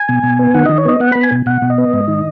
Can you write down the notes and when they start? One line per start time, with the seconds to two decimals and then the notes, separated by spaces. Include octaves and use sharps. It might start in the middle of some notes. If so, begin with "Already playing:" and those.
Already playing: G#5
0.09 B2
0.23 B2
0.39 B3
0.54 D#3 F#5
0.66 D#3 D#5
0.78 C#5
0.85 B3 D#5
1.00 B3 F#5
1.12 B3 B5
1.23 G#5
1.32 B2
1.46 B2 F#5
1.62 B2
1.70 D#5
1.78 B3
1.93 G#2
2.08 D#3